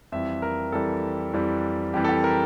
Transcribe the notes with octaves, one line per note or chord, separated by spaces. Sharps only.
F2 E3 G3 E5
A#4
F2 E3 G3 A4
F2 E3 G3
F2 E3 G3 G4
A4
G4
A#4